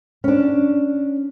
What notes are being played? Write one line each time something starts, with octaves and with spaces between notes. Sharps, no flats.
C#4 D4